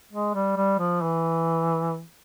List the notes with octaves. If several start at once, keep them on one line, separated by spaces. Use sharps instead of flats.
G#3
G3
G3
F3
E3